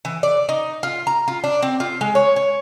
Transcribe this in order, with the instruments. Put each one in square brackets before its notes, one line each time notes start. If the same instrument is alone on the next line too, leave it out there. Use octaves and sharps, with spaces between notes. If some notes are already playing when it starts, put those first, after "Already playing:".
[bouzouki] E3
D5
D#4
F4
A#5
F4
D4
C4
F4
G#3
C#5
C#5